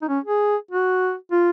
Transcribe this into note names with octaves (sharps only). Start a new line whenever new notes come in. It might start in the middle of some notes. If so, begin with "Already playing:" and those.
D#4
C#4
G#4
F#4
F4